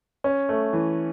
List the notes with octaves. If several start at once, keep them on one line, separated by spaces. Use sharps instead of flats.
C#4
A3
E3